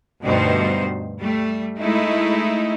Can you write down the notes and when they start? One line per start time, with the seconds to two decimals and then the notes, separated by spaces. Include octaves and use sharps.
0.24 D2 G2 B2 G3 D#4 C5
1.19 G3 A3
1.78 G#3 A3 D#4 E4